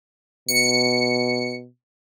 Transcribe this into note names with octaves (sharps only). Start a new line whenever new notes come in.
B2 C#7